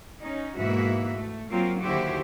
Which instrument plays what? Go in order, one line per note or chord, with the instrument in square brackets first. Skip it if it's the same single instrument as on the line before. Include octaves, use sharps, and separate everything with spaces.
[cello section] C#4 D#4
G#2 B2 E3 A#3 F#4 E5
A3
F#3 A#3 C4 F4 A#4
D#2 D3 E4 F#4 G4 C5